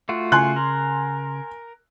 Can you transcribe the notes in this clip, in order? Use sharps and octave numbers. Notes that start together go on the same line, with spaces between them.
A3 F4 F#4
C#3 G#5 C6 F#6
A#4